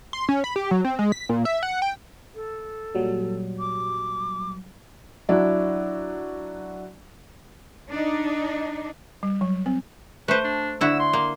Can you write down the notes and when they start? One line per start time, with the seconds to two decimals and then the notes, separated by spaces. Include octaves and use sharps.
0.13 C6
0.29 C#4
0.44 B5
0.56 G4
0.71 F#3
0.85 C4
0.99 G#3
1.12 B6
1.29 A#2
1.45 E5
1.63 F#5
1.82 G5
2.35 A4
2.95 A#2 F#3 G3
3.59 D6
5.29 F#3 D4 E4
7.89 D4 D#4
9.23 G3
9.41 F#3
9.66 C4
10.28 A3 B4 C5
10.44 D4
10.81 D3 E4 F#4 E6
11.00 C6
11.13 A#3